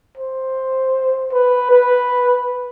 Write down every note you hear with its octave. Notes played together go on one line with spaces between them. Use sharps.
C5
B4
B4